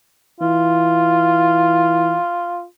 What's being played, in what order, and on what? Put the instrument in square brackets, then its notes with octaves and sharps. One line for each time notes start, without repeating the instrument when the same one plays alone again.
[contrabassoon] E3 [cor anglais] F4